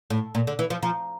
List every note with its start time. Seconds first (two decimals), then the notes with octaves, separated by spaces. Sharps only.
0.10 A2
0.35 A#2
0.47 D3
0.59 E3
0.70 F3
0.83 F3 A#5